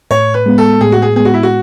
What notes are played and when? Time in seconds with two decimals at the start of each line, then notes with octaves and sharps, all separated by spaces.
0.11 A2 C#5
0.34 B4
0.46 G#3 B3
0.58 A4
0.81 A2 G#4
0.92 F#4
1.02 G#4
1.16 G#3 B3 G#4
1.25 F#4
1.34 E4
1.43 F#4